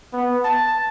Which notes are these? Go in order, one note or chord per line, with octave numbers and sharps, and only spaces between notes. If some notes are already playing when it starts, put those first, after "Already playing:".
B3
A5